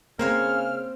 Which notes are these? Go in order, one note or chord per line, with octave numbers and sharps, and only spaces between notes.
C#3 A#3 C4 C5 C#5 F6